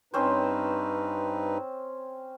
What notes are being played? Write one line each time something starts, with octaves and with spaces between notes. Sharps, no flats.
G2 C4 C#4 D#4 B4 C5